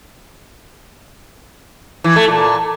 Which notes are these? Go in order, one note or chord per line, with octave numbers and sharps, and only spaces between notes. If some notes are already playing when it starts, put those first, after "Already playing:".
E3
A3
A#2